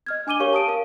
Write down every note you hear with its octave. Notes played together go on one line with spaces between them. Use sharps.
D#5 F6 G#6
D4 G#5 D6 D#7 G7
G4 A#4 C#5 F5 C#6
A5 D#6 D7 D#7
A#4 F5